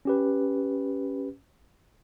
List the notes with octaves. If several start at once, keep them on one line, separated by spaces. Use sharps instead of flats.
C#4 G4 B4